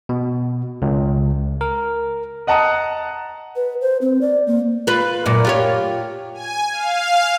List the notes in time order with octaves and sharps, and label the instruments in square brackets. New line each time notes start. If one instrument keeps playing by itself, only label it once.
[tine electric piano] B2
C#2
A#4
[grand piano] D#5 F#5 A5 A#5 D#6
[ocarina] B4
C5
C4
D5
A#3
[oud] F4 B4
F#2 A#2
F4 G4 C#5
[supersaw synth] G#5
F5